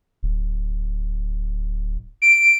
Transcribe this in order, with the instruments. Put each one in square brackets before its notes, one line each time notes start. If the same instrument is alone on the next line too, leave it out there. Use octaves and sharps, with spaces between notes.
[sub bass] D1
[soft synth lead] D7